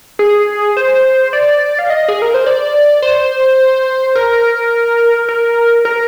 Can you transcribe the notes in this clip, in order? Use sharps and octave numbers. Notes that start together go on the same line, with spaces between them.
G#4
C5
D5
F5
D#5
G#4
A#4
C5
D5
C5
A#4
A#4
A#4